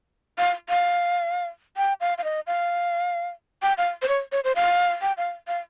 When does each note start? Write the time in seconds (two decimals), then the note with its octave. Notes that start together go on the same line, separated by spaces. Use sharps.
0.38 F5
0.69 F5
1.77 G5
2.01 F5
2.18 F5
2.24 D#5
2.47 F5
3.62 G5
3.78 F5
4.02 C5
4.08 C#5
4.32 C#5
4.44 C5
4.56 F5
5.02 G5
5.18 F5
5.48 F5